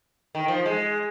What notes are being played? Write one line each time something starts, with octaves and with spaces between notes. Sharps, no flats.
D#3
F3
G#3